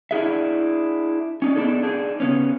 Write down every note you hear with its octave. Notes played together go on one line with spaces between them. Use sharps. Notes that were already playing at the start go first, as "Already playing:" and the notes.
D4 E4 G#4 E5
C#4 D#4 D5
B3 D4 D#4 G#4 A4
D4 D#4 G#4
C#3 B3 C#4